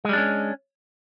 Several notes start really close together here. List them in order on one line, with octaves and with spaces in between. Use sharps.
G#3 G3 D4 C#4